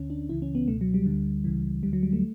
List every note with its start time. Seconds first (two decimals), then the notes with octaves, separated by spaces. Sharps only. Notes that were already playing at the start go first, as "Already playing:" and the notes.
Already playing: D2 D3 C#4
0.10 D4
0.29 C#2 C#3 E3 E4
0.42 C#4
0.55 B3
0.68 C#2 B2 A3
0.81 F#3
0.94 G3
1.06 D2 D3
1.44 C#2 C#3 E3
1.83 D2 D3 G3
1.93 F#3
2.03 G3
2.13 A3